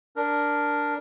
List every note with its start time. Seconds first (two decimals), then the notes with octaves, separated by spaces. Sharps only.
0.16 D4 A#4